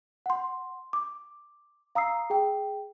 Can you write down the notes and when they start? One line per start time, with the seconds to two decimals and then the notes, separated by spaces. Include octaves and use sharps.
0.26 F#5 C6
0.93 D6
1.95 F5 A#5 D#6 E6 C7
2.30 G#4 G5